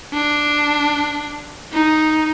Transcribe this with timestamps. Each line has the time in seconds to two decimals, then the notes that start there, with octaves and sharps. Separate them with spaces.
0.14 D4
1.73 D#4